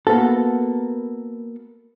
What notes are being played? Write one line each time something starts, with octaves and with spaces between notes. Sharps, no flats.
A#3 B3 F#4 A4